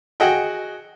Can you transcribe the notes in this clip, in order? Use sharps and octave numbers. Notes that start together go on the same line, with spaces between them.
F#4 G#4 D#5 F#5 G5